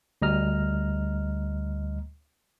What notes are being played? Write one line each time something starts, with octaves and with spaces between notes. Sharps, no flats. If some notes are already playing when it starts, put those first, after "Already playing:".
D2 G3 D#5 A#5 F6